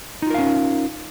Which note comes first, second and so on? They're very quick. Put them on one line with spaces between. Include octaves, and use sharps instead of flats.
D#4 F4 A#4 F5 C#4